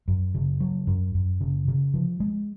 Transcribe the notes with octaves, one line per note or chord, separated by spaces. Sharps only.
F#2
C#3
F#3
F#2
F#2
C#3
C#3
F3
G#3